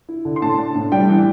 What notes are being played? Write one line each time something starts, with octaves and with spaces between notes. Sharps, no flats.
E4
D3
C6
A2 A5
D4
A2
G3 G5
E3